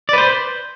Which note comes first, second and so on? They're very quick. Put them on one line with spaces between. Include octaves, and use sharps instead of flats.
D5 B4 C5